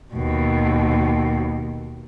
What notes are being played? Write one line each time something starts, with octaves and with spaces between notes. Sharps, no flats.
D#2 B2